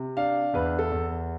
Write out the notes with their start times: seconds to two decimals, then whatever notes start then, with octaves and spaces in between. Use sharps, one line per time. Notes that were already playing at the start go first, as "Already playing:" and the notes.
Already playing: C3
0.17 D4 F5
0.54 E2 B4
0.79 A4
0.91 E2